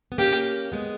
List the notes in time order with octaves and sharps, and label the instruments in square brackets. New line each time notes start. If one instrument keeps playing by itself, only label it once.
[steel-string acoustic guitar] B3
[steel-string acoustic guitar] A#3 C#4 [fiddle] G4
[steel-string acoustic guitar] G#3 B3